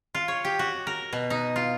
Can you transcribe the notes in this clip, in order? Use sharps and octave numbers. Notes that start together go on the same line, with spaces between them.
F4
C#5
G4
F#4
A#4
B2
D#4
F4